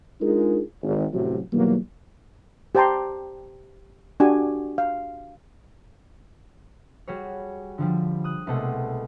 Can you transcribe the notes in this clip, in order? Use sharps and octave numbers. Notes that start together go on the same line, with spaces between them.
G#3 D4 D#4 F4 G#4 A#4
G#1
A1 A2 C3 F#3
E2 B2 D#3 F#3 G3 A#3
G4 C5 G5 A5 A#5 C6
D4 F#4 G4 G#5
F5
G3 F#4 G#4 C#5
D3 F3 G3
D#6 F#6
C2 B2 G#3 A3 A4 F#5